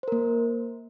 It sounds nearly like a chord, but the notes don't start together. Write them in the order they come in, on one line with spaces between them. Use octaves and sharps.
C5 A#4 A#3